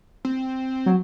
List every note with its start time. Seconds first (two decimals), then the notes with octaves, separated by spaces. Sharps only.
0.25 C4
0.86 F#3